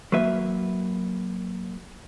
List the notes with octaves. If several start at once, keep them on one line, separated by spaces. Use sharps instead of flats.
F#3 A#3 B4 E5